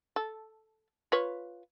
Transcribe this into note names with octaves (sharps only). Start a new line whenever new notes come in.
A4
F4 B4 C#5